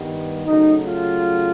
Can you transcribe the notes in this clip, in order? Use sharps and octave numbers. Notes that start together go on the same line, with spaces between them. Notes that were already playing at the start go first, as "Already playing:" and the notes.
Already playing: G2 D#3 G3 B3
C#3 F#3 A3 D#4
F4